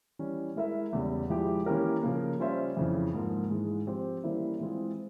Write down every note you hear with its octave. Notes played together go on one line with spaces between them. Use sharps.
E3 G3 C#4
G#3 E4 A#4 E5
E2 C#3 G3
F3 G#3 E4 G4
E3 A#3 C#4 G4 A#4
C#3 F3 A#3
G3 C#4 F4 C5 E5
F2 C#3 E3
G#2 F3 A#3
G#2 E3 G#3
F3 C4 G4 C5
E3 G3 A#3 C#4 E4
E3 G#3 C4 F4 G#4